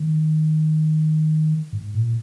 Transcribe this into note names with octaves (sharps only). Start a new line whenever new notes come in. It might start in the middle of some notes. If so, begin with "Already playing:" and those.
Already playing: D#3
G#2
A#2